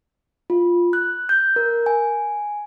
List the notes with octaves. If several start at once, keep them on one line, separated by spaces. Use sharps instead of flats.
F4
F#6
G6
A#4
G#5